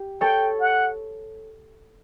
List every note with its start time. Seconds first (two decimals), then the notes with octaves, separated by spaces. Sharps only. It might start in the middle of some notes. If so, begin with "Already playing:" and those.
Already playing: G4
0.21 A4 C#5 G5
0.60 F#5